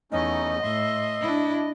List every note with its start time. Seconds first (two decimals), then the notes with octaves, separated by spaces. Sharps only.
0.12 E2 A3 C#4 D#4 D#5
0.63 A2 E5 C6
1.21 D4 E4